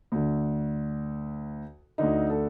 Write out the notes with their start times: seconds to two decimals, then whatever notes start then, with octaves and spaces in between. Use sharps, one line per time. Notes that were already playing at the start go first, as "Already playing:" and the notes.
0.12 D2 D3
1.98 D2 D3 D#4
2.30 A4